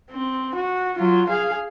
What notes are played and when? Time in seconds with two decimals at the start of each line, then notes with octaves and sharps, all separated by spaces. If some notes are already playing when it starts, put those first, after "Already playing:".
0.11 C4
0.55 F#4
0.97 F#3 F4
1.29 G#4 F5